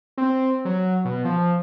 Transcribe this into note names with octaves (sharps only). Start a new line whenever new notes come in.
C4
F#3
B2
F3